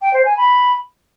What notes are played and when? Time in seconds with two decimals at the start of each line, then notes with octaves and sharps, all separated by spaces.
0.01 G5
0.13 C5
0.25 G#5
0.37 B5